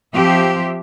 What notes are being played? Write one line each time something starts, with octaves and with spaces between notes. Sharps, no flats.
F3 C4 G4 E5